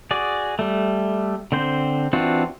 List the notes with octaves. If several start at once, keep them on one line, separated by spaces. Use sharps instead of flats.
F#4 G#4 D5
G3 A3
D3 C4 C5
E3 C4 D4 F4 F#4